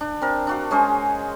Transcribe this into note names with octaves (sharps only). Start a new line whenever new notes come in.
D4
C4 A#4
D4 F#4 F5
G#3 C#4 G#4 C5